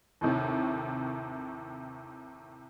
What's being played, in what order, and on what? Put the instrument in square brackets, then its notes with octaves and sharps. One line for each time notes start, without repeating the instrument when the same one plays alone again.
[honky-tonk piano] D#2 A2 C3